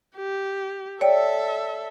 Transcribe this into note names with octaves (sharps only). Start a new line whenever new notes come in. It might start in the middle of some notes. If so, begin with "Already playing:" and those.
G4
A4 C#5 D5 E5 G5